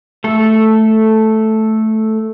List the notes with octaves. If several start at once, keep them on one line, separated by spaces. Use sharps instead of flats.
A3 A4